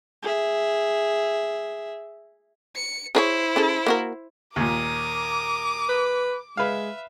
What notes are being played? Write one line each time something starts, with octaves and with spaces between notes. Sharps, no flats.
G#4 E5
C#7
E4 G#4 A#4 C5 C#5
C#4 G#4 A4
A#3 F#4 A#4
D#2 A#2 A#4 D6 D#6
B4
G#3 B4 E5 F5